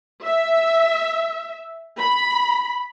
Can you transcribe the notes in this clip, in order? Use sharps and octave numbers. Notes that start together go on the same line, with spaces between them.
E5
B5